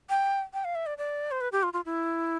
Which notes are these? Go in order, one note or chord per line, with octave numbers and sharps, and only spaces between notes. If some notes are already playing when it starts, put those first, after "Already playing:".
G5
G5
F5
E5
D5
D5
C5
B4
G4
F4
F4
E4